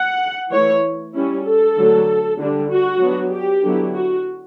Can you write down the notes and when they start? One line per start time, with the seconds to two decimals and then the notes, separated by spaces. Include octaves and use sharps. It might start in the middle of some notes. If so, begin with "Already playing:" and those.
Already playing: F#5
0.51 E3 A3 E4 C#5
1.14 G3 C#4 E4
1.45 A4
1.76 D3 F#3 A3
2.39 D3 G3 D4
2.70 F#4
3.01 F#3 B3 D4
3.32 G4
3.64 D3 F#3 B3 E4
3.95 F#4